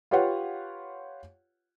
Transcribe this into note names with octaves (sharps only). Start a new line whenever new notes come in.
F4 G4 B4 C#5 F#5